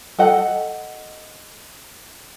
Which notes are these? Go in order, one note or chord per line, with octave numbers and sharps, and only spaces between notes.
A4 D#5 F#5